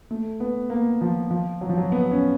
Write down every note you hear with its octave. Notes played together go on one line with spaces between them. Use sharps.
A3
B3
A#3
F3
F3
F#3
F3
F#3
B3
C#4